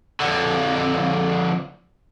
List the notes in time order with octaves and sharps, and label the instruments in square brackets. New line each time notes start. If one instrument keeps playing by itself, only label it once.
[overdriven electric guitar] F2 D3